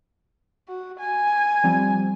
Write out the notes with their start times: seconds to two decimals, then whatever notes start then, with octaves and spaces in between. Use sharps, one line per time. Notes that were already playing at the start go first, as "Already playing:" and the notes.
0.68 F#4
0.99 G#5
1.64 F3 G3 C4